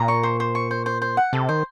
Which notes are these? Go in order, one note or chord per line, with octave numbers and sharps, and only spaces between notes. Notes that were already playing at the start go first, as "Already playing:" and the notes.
Already playing: A#2 A#5
C#6
C5
C5
C#6
C5
C5
C5
F#5
C3 A4
D#3 C5